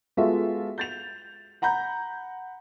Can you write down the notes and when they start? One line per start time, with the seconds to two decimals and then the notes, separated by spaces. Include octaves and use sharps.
0.17 G#3 B3 F4 F#4 A4 E5
0.78 G6 A6 F7
1.62 F#5 A#5 B5 G6